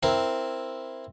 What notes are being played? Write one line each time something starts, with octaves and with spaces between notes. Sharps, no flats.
C4 E4 A#4